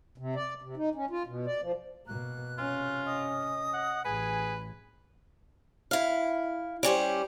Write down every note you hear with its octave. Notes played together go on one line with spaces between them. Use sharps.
C3
D5
C3
D#4
C#4
F4
B2
D5
F3
B2 A#3 F#6
C3 C#4 F4
D#5 D#6
F#5
A1 G#4 B4 G#5
E4 F5
G3 C#4 G4 C5